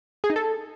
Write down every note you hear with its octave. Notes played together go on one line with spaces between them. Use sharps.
G#4
D#4
A4